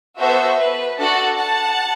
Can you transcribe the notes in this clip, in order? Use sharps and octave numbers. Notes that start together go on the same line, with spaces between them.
B3 F#4 A4 C5 E5
B4
D4 F#4 A4 F#5 A5
F#5 A5